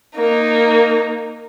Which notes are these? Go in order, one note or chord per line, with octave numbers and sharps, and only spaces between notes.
A#3 D#4